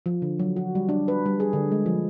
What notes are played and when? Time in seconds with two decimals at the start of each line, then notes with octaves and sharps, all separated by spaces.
0.06 F3
0.22 D3
0.39 F#3
0.56 F#4
0.75 G3
0.89 D4
1.08 B4
1.26 G3
1.40 G#4
1.53 D3
1.72 G#3
1.86 F3